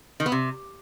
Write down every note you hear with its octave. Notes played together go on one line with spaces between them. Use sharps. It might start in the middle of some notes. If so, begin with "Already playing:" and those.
D#3
B3
C3